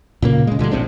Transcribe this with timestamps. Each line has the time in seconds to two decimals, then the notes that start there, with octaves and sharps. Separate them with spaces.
0.22 A#2 C#3 A#3
0.47 C#3 G#3
0.59 A#2 D3 G3 G#3
0.72 A#1 A2 C4 D4